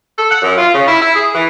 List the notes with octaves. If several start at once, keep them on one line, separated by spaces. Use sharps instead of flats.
A4
F#5
F#2
F4
C#3
E4
E4
G#4
E3